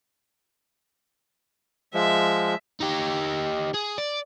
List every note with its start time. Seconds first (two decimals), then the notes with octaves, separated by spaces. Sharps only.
1.94 F3 G#3 E5
2.80 D#4 G4
3.74 G#4
3.98 D5